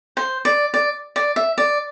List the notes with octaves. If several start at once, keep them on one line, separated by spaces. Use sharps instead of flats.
C5
D5
D5
D5
E5
D5